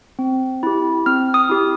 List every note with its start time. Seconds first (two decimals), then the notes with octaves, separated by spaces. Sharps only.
0.19 C4
0.63 E4 G4
1.06 C4 F6
1.34 D#6
1.49 E4 G4